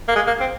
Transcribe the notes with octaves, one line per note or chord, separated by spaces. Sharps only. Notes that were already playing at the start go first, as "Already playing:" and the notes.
A#3
G#3
A#3
C4